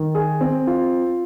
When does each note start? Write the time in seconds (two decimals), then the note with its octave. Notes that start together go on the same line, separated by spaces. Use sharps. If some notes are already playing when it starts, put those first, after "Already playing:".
Already playing: D#3
0.15 G#4
0.41 C4
0.67 F4